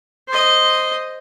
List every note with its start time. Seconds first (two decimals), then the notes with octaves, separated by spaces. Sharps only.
0.29 C5 D#5